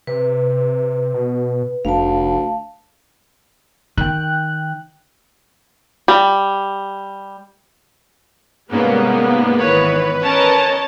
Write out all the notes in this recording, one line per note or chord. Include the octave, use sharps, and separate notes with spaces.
C3 B4
B2
F1 D2 F5 A5
D#3 G5 F#6
G3
G#2 C3 G3 A#3 B3 C#4
G#1 D#3 E3 B4 C#5
C#4 A#4 C#5 D#5 A5